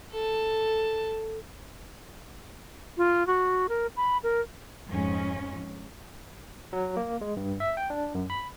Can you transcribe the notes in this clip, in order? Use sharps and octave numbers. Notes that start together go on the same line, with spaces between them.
A4 A5
F4
F#4
A#4
B5
A#4
F2 G#2 G#3 C#4
F#3
A#3
G#3
G2
E5
G5
D4
F#2
B5